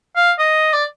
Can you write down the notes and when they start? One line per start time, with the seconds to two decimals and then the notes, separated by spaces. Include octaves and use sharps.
0.16 F5
0.39 D#5
0.73 D5